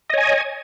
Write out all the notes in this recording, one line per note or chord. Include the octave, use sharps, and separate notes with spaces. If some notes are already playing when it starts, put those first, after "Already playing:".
C#5 D#5 G#5